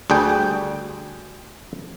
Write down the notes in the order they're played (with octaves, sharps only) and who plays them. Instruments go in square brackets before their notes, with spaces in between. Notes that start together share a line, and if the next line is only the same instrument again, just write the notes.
[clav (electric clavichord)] D2 G3 G#4 G5